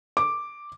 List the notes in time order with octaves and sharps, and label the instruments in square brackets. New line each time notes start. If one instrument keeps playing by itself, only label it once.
[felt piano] D6